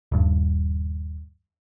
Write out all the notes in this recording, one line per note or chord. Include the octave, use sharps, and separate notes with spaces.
D#1 G2